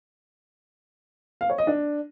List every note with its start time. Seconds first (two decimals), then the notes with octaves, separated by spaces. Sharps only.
1.41 F5
1.50 C#5
1.58 D#5
1.67 D4